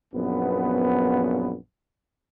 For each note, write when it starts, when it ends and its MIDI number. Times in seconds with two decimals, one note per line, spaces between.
0.14 1.55 34
0.14 1.55 42
0.14 1.55 59